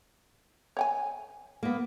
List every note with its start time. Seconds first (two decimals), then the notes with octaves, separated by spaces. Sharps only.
0.77 C#5 G5 G#5
1.63 A#3 B3